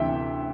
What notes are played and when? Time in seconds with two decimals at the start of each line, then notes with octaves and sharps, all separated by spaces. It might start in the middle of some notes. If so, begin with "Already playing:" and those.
Already playing: D2 C3 E3 E5 G5